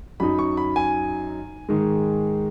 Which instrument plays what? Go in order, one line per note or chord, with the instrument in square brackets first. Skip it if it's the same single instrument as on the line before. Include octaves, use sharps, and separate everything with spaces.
[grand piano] F#2 F#3 D#4 B5
C#6
B5
G#5
G#2 D#3 G#3